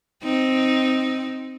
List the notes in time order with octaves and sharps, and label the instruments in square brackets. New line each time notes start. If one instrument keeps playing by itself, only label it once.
[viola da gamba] C4 D#4